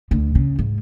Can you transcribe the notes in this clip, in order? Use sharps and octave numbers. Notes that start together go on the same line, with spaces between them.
D2 D3
C#3
G#2